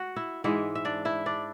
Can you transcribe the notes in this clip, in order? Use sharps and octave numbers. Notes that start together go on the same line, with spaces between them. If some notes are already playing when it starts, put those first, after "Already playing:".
Already playing: F#4 F#5
E4 E5
G#2 E3 G#3 E4 E5
E5
D4 D5
E4 E5
D4 D5